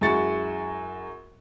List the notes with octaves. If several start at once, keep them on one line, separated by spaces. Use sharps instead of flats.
F#2 G#3 E4 F#4 A6 C#7